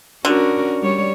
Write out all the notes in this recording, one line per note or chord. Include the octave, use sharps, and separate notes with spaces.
D3 C#4 F#4 A#4
G3 C#5